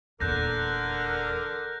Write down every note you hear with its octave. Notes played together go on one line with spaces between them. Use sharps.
D#1 E2 D3 A#4 F#6 G6 A#6